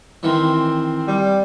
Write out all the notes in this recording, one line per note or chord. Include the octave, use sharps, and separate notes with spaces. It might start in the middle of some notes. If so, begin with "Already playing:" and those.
D#3 E3 C4
G3